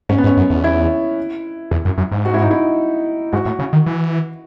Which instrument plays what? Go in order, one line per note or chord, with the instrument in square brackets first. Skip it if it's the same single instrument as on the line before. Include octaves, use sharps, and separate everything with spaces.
[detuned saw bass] G#2 [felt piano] C#4
[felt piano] B3
[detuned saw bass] G#2
[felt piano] C#4
[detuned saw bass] F#2
E2
[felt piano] E4
[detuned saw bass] E2
F#2
F#2
G#2
[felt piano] F#4
E4
D#4
E4
[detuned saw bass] G#2 [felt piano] F#4
[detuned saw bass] A2
C#3
D#3
E3